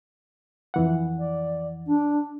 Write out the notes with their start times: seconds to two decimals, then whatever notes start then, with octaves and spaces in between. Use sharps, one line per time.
0.74 F2 E3 F#5
1.19 D5
1.87 D4